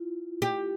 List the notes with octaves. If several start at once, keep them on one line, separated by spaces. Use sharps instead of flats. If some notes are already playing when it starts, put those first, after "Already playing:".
Already playing: E4 F4
G4